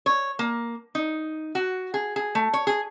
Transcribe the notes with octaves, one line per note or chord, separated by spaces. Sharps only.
C#5
A#3
D#4
F#4
G#4
G#4
A3
C#5
G#4